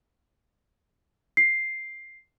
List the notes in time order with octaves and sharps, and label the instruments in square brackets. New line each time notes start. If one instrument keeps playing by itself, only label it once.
[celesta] C7